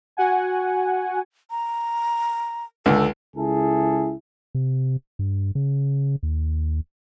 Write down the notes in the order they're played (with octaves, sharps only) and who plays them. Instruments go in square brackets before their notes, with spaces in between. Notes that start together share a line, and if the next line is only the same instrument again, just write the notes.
[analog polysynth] F#4 F#5 G#5
[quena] A#5
[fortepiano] C#2 D3 [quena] A4
[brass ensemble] C#2 E4 G#4 A4
[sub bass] C3
G2
C#3
D#2